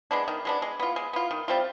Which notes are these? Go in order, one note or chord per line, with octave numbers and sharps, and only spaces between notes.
G#3 B3 D4
D#3
G#3 B3 D4
G#3
B3 F4
G#3
B3 F4
D#3
G3 C4 F4